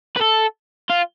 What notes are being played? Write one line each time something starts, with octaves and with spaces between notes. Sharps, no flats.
B4
A4
F4